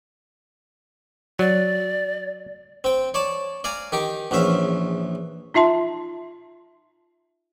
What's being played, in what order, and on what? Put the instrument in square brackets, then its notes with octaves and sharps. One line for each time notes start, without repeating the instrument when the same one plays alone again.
[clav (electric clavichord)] F#3 [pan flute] D5
[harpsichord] C4 G5
C#5 D5 A5
D5 F5 G#5 A#5
D#3 G4 D6
A#1 E2 C#4 E5 F5
[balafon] D#4 F4 E5 A5 C6